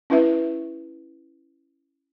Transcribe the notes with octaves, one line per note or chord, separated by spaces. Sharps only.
C#4 E4 B4 E5